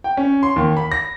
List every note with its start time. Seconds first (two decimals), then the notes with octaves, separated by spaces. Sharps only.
0.04 G5
0.17 C#4
0.43 C6
0.56 D#2
0.77 B5
0.92 A#6